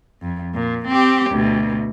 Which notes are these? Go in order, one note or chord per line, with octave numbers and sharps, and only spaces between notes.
F2
A#2
C4 G4
D2 B2